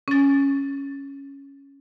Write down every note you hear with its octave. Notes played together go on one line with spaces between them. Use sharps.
C#4 A6